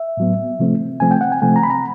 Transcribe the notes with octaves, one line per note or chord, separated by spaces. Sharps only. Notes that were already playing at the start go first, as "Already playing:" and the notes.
Already playing: E5
A2 F#3 B3
C3 F3 A3 C4
C3 F3 A3 C4 G#5
G5
F#5
G#5
C3 F3 A3 C4 G#5
A#5
B5
A#5